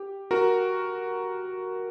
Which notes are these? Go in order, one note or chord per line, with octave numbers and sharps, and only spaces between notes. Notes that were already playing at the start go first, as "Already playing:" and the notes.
Already playing: G4
F#4 A#4